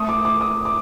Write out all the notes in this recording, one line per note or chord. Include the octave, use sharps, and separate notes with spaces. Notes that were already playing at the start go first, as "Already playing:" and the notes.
Already playing: A3 D#6
D6
D6
D#6
D6